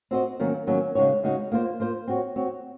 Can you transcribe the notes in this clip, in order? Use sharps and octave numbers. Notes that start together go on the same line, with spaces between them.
C4 F#4 C5 D#5
D#3 F#3 A#3 C#4
D#3 F#3 A#3 C#4
C#3 G#3 D#4 F#4 C#5
C#3 G#3 D#4 F#4 C#5
A#3 F4 C5
A#3 F4 C5
C4 F#4 C#5
C4 F#4 C#5